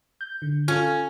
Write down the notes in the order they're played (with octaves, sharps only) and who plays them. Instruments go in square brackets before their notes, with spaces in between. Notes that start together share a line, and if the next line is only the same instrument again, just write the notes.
[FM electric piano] G6
D3
[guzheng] C#4 [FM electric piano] F4 A4